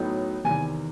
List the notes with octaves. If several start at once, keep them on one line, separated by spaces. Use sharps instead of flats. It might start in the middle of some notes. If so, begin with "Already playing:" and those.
Already playing: A2 F#3 B3 D#4
E2 C3 D#3 G#5